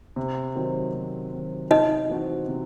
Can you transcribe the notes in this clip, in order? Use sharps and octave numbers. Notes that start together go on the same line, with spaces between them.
C3
D#3 F#3 C4
C3
D#3 F#3 C4
C3 D#4 D#5
E3 C4 F#4 C5
C3